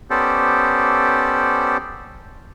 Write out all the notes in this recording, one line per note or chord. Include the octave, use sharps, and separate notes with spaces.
B3 C#4 G4 A4 C5 D5